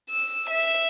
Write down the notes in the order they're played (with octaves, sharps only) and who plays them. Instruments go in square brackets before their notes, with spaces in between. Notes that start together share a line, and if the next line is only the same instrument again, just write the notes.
[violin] E6
E5